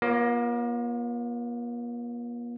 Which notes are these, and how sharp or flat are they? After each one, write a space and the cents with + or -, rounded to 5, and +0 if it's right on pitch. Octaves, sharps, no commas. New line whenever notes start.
A#3 +45 F4 +0 C#5 -5